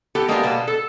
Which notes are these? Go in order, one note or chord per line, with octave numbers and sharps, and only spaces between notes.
B3 G4 A4
G#3 A#3 B3 D4 G4 A#4
B2 A#3 B3 A5
A4